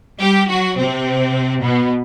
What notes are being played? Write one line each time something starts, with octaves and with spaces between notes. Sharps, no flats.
G3 G4
F#3 F#4
C3 C4
B2 B3